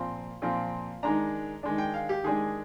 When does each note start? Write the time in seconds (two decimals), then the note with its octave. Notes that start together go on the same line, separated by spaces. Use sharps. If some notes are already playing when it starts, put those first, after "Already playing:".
Already playing: A#2 F3 C4 C6
0.42 A#2 F3 C4
1.03 D#3 G#3 D4 A#5
1.63 D#3 G#3 D4
1.78 G5
1.94 F5
2.09 G4
2.23 D#3 G#3 D4 G#4